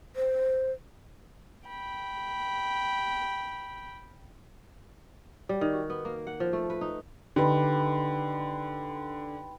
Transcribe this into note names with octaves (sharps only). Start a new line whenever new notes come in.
C5
G5 B5
G3
D#3
F#4
B3
A#3
F#5
F3
A3
B4
D#4
D3 D#4 G4 B4 G5 B5 C6